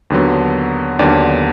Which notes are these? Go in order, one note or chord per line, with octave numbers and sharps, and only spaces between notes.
D#2 D3 F#3 B3
D#2 D3 F#3 B3 D5